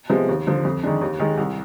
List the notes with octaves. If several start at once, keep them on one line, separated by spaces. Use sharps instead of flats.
C3 F3 G#3 B3
D#2
D3 F3
F2
D#3 G#3 D4
D#2
D#3 G#3
C2